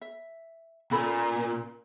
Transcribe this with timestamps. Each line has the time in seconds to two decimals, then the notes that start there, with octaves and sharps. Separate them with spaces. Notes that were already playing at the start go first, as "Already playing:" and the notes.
0.01 E5
0.91 A#2 C#4 A4 B5